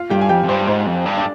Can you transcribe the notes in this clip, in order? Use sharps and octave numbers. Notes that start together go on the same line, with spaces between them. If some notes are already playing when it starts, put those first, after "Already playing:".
Already playing: F4 F5
G2 G4 G5
G#5
F2 G4 G5
F2
G2 C5
G#2 C5
F2
G2
D4 D5